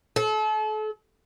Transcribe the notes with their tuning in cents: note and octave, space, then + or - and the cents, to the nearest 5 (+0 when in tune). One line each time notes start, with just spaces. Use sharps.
A4 -35